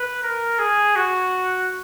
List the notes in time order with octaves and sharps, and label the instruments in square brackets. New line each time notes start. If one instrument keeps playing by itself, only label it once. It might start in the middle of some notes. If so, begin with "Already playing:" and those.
Already playing: [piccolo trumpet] B4
A#4
G#4
F#4